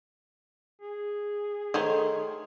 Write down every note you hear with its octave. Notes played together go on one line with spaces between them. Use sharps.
G#4
D#3 A3 C5 C#5